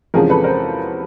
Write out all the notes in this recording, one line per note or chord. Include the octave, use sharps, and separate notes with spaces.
E2 C3 F3 G#3 C#4 G#4 A#4
A4 B4
A#4 C5